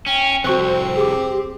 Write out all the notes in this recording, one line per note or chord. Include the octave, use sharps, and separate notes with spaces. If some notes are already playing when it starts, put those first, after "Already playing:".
C#4 G5
C2 F2 C4 F#4 C5 C#6 F#6
G4 G#4 D6